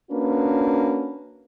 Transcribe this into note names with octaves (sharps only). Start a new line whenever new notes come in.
A#3 C#4 D4 F#4 B4